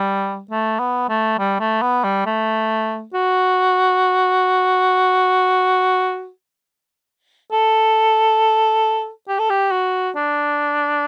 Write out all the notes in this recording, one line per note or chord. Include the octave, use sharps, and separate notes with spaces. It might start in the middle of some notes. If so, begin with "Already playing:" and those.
Already playing: G3
A3
B3
A3
G3
A3
B3
G3
A3
F#4
A4
G4
A4
G4
F#4
D4